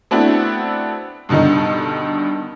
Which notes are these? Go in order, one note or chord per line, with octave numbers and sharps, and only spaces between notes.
A3 B3 C4 D4 E4 F#4
G2 B2 D3 D#3 D#4